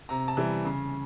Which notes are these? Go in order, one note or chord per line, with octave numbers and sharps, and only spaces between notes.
C3 A#5
A5
E3 G3
C#3